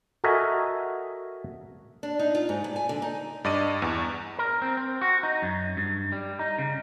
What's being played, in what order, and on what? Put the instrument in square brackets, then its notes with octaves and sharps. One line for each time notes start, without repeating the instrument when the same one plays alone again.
[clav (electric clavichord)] F#4 A4 A#4 D#5 E5 G#5
[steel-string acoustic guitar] D4
D#4
F4
G#2
G2
G#5
D3
D#4
[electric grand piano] G2 D5 D#5 D#7
E2
[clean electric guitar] A#4
C4
C4
F#4
D#4
F#2
G2
G3
D#4
C#3